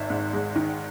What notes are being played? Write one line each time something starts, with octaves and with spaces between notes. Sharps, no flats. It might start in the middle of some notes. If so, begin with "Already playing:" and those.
Already playing: G#1 D#3 D5 E5
G#2
G#3
D#3